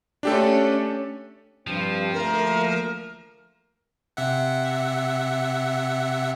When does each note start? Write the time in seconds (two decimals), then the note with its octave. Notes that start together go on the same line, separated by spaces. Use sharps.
0.23 A3 C#4 D4 G4 A4
1.67 G2 F3 C4
2.13 D2 A3 A#3 A#4
4.17 C3 E5 F#5